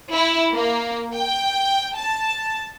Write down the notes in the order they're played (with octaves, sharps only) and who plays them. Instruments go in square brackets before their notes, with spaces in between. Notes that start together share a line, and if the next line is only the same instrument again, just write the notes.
[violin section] E4
A#3
G5
A5